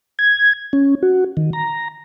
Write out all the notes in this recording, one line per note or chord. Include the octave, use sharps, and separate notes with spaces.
G#6
C#4
F#4
D#3
A#5